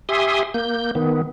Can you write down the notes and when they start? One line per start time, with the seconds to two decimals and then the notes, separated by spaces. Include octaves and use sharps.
0.09 G4 E5 G#5 C6 D#6
0.54 A#3 G6
0.95 D#3 B3